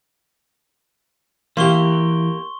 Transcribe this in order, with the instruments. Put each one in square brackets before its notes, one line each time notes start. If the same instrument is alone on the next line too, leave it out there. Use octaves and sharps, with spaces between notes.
[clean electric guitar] E3 [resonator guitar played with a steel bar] A#3 G4 [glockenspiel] C6 C#6 G7